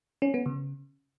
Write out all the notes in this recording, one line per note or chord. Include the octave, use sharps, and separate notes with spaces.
C#4
B3
C#3